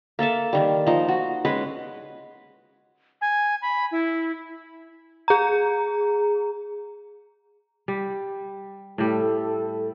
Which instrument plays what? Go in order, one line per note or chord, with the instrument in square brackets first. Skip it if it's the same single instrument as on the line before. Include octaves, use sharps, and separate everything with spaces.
[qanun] A#3 A4 E5 A5
D#3 G3
F3 D#4
F#4
G#3 C#4 B4
[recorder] G#5
B5
E4
[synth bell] G#4 A#5
[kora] G3
[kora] A2 G3 [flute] A4